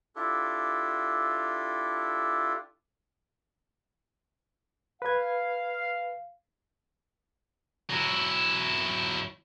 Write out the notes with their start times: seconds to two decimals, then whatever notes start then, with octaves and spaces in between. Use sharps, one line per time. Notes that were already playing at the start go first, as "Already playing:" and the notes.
0.16 D4 E4 F4 G4 A4
5.02 B4 F5 G#6
7.90 F#3 E4